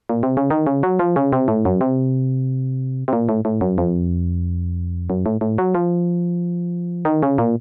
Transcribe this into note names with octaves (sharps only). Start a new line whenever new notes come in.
A#2
C3
C#3
D#3
C#3
F#3
F3
C#3
C3
A2
F#2
C3
C3
A#2
A2
A2
F#2
F2
F#2
A2
A2
F#3
F3
D#3
C#3
A#2